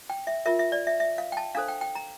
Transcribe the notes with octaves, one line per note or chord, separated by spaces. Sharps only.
G5
E5
F4 A#4 E5
E5
D5
E5
E5
F5
G5
A5
D4 A4 C5 F5
G5
G5
A#5